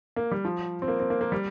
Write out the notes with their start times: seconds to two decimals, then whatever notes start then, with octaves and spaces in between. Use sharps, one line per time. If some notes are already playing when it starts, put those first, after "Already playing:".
0.16 A#3
0.31 G3
0.45 F3
0.82 C4
0.88 A#3
1.00 C4
1.10 A#3
1.21 A#3
1.32 G3